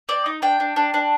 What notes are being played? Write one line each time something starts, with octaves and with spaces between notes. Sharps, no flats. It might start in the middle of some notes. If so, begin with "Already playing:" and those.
C4 D5
D#4
D4 G5
D4
D4
D4